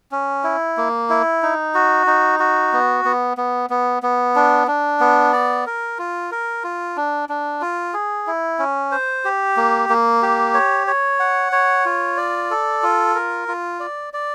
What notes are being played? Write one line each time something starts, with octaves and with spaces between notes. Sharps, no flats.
C#4
E4
A#3
E4
D#4
F#4
D#4
F#4
B3
B3
B3
B3
B3
D4
D4
B3
D5
A#4
F4
A#4
F4
D4
D4
F4
G#4
E4
C#4
C5
G4
A#3
A#3
G4
C#5
C#5
F#5
C#5
F4
D5
A4
F4
A#4
F4
D5
D5